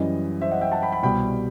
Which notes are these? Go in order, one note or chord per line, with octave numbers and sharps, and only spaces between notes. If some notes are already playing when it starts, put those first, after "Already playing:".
Already playing: F#2 E3 G3 D#5
C5 E5
D#5 F#5
E5 G5
F#5 A5
G5 B5
G5 B5
C2 B2 G3 G5 B5